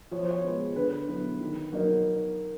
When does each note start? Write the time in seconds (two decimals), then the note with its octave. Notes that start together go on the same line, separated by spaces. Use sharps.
0.11 F3 C#5
0.21 C5
0.31 C#5
0.44 G#3 B3
0.76 D3 B4
1.08 F#3 B3 E4
1.41 D#3
1.72 F#3 A#3 D#4